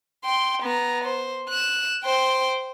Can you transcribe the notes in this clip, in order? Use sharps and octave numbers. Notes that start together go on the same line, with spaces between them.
G5 C6
B3 A#5
C5
F#6 E7
C5 G5